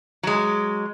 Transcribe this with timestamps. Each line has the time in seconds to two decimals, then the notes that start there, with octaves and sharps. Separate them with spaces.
0.23 F#3 G#3